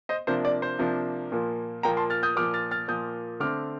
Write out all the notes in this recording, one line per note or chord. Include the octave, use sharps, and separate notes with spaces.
C5 D#5
C3 F3 A#3 D4 C5
D5
C5
C3 F3 A#3 D4
A#2 F3 A#3
A#2 F3 A#3 G5 A#5
A5 C6
F6 A6
D#6 G6
A#2 F3 A#3 D6 F6
F6 A6
F6 A6
A#2 F3 A#3 D#6 G6
D3 A3 C4 D6 F6